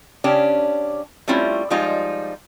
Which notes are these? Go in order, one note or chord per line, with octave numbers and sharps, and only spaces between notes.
C#3 C#4 D4 G4
G3 A3 C4 C#4 E4 F4
F3 G3 G#3 D#4 F4